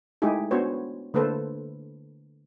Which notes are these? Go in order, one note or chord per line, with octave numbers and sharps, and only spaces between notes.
G#3 A3 D#4 E4 G4 G#4
B3 D4 F#4 C5 C#5
D3 A3 A#3 A4 B4 C5